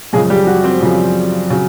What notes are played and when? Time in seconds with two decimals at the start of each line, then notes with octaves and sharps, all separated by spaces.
0.13 F#2 C#3 F3 G#3 G#4
0.30 G3 G4
0.47 F#3 F#4
0.64 C4 C5
0.80 F#2 C#3 F3
1.50 C#3 F#3